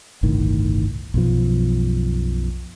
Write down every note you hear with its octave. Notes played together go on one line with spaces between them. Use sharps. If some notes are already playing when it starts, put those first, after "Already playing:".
G1 C2 A2 D#3
B1 F#2 B2 F3